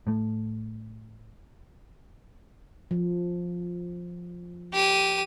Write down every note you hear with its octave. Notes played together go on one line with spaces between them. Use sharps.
A2 A3
F3
G4 D#7